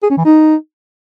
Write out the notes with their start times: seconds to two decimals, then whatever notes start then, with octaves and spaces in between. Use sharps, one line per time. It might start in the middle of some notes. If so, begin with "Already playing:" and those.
0.03 G#4
0.10 C#4
0.18 E3
0.25 D#4